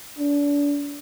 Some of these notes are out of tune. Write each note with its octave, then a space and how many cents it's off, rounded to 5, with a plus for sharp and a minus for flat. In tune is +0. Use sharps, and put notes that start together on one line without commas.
D4 -30